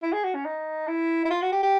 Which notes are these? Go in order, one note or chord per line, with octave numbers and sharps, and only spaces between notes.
E4
G#4
F#4
C#4
D#4
E4
E4
F4
F#4
G4
G4